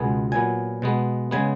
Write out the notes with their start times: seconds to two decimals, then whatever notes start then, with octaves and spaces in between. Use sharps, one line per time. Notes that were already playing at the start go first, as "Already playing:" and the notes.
Already playing: C#2 B2 G#3 B3 G#5
0.32 A#2 F#3 B3 G#5
0.82 B2 G#3 B3
1.31 C#3 G#3 B3 G#5